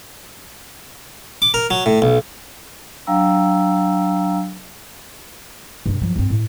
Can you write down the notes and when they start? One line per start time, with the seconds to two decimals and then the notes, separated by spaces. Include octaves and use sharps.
1.42 D6
1.54 A#4
1.70 F#3
1.86 A2
2.02 B1
3.07 F#3 D4 F5 G5 A#5 E6
5.86 G2 C3
6.02 F3 F#3
6.16 G2 C4
6.30 A2